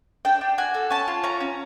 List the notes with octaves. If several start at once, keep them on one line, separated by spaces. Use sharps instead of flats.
D4 G5
D4
F#4 G#5
A4
C#4 A5
F4
C#4 A#5
C#4